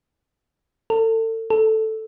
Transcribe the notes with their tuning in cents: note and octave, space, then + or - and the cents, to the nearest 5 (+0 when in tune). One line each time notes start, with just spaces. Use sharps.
A4 +35
A4 +0